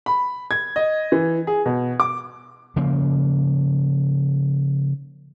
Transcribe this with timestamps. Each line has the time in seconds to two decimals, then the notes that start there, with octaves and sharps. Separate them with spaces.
0.06 B5
0.51 G#6
0.76 D#5
1.12 E3
1.47 G#4
1.66 B2
2.00 D6
2.76 C#3 F3 A#3